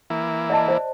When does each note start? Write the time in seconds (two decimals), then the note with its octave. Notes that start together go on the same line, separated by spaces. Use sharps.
0.10 E3 A#3 E4
0.50 D5 D#5 A5
0.68 C5 D5